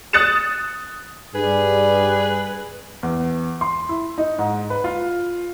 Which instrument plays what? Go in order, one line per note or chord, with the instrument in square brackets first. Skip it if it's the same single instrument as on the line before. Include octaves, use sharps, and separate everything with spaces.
[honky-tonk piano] D#6 F#6 A6 C#7 E7
[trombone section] G2 [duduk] G3 [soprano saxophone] G#4 [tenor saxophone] B4
[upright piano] E2
C6
E4
D#4
G#2
B4
F4